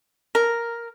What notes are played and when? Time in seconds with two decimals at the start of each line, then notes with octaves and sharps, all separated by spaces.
0.35 A#4